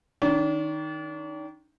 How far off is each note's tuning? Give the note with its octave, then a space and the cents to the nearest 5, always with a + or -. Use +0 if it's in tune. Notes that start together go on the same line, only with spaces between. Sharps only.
D#3 +0 D4 -40